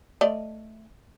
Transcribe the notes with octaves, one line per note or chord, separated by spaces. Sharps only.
A3 D5 D#5